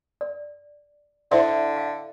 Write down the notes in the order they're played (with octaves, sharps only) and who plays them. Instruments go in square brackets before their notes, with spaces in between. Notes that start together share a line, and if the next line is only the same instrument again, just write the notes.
[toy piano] D5
[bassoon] D3 [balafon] E4 C5 C6 [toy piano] D5 E5
[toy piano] F5